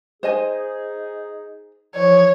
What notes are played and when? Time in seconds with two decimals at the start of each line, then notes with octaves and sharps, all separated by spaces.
0.23 D#4 G#4 C5 D#5 G#5
1.95 E3 F3 C#5